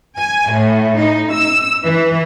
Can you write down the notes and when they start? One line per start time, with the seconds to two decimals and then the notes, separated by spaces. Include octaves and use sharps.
0.20 G#5
0.52 A2
1.00 D#4
1.32 E6
1.85 E3